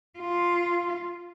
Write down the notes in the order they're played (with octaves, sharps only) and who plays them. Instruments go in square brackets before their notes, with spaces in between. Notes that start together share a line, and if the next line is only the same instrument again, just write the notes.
[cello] F4